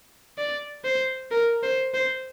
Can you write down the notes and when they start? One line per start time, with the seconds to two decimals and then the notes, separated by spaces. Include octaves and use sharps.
0.38 D5
0.84 C5
1.31 A#4
1.63 C5
1.94 C5